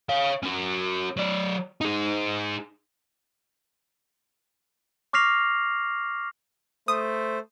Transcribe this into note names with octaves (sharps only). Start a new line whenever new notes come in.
C#5 F5
C#4 F#4
F#3 D5
D#4 G#4
C#6 D6 F6 A#6 C7 F7
A3 C5 D#6